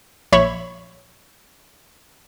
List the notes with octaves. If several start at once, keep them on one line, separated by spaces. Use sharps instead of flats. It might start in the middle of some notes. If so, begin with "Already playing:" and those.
A#1 C#5 E5 B5 C#6